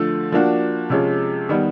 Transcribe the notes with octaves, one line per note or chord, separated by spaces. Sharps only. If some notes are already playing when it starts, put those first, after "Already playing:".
Already playing: D3 F3 A3
F3 A#3 D4 F#4
C3 F3 G#3 C#4
D#3 G3 B3